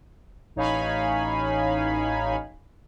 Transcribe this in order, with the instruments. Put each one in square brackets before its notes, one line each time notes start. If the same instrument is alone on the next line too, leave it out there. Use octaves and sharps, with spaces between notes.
[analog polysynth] A1 D#4 C#5 F5 G#5 B5